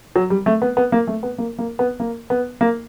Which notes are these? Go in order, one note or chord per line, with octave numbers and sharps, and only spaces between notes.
F#3
G3
A3
B3
B3
A#3
A3
B3
A#3
A#3
B3
A#3
B3
A#3